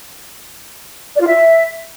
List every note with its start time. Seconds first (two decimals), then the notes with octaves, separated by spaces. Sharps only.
1.15 D5
1.21 F4
1.27 E5